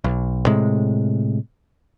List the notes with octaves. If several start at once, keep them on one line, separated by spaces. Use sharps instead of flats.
B1
A2 C3 G#3